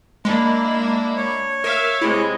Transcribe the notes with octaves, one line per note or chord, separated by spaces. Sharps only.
G#3 A#3 D4 E4
C#5
A#4 E5 F5
C3 G#3 E4